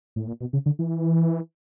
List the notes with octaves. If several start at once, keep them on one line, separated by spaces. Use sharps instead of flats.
A2
A#2
B2
C#3
D3
E3